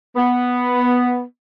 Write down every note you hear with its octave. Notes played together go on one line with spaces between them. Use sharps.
B3